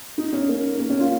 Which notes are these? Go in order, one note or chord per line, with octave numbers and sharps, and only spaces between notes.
D#4
C#4
A#3
A#3
C#4
F4